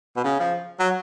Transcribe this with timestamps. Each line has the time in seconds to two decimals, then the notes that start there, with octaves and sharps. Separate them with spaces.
0.17 B2
0.24 C#3
0.40 F3
0.80 F#3